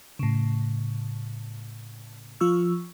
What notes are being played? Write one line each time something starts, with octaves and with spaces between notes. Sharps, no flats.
A2 C#3
F3 F4 C#6 E6